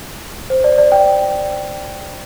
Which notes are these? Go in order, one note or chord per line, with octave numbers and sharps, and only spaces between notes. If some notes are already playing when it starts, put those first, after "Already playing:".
C5
D5
D5
G5